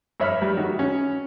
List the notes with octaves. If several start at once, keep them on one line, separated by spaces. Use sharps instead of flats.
G2 C#5 E5 B5 F6
G3
D#3 F#4
C#4